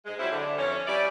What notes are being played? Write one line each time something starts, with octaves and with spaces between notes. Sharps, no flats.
G#2 G#3
F#3 G3 C4 E4
D3
F2 E3 C#4
G3 C#4 E4 D5